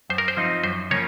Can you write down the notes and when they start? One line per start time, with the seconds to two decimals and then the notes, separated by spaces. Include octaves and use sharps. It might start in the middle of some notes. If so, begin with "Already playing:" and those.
0.09 F#2 C5
0.18 A#4
0.28 C5
0.37 F3 C4 D#4
0.64 F#2 C5
0.91 C#3 F3 A#3 C#4 C#5